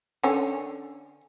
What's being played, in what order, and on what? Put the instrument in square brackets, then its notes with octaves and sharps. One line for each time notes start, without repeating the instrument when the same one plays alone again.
[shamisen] D3 C#4